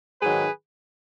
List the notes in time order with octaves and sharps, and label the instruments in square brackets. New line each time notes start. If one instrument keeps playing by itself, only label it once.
[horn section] G#2 D#3 F#3 G#4 B4